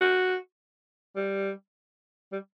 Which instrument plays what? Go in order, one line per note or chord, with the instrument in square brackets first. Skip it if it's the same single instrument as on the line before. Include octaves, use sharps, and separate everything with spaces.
[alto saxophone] F#4
G3
G3